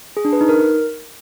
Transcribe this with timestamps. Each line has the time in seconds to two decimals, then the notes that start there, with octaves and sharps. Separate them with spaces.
0.17 G#4
0.25 D4
0.33 B4
0.41 D#4
0.49 A#4